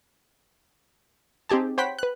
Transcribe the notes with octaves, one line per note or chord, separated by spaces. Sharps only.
C4 D#4 G4 G#4 A5
C5 C#5 F#5 G5 B5 B6
B4 F#6